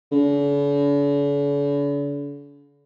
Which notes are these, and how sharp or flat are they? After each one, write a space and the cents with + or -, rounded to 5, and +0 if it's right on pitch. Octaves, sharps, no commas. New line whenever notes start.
D3 -45